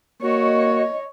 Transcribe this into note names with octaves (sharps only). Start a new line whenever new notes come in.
A#3 F#4 C#5 D#5